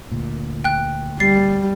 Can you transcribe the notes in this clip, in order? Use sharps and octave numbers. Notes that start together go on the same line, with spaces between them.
D2 A#2
G5 F#6
G3 A6 C7